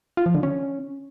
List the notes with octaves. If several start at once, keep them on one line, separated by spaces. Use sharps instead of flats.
F4
F3
D3
C#4